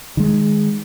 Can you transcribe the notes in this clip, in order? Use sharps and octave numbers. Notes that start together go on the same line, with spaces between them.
D#3 G#3